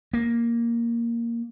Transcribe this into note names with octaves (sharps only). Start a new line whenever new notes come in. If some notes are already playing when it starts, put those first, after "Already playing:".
A#3